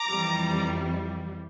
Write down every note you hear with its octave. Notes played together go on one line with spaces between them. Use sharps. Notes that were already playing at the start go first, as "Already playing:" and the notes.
Already playing: A#5 D6
F2 E3 G3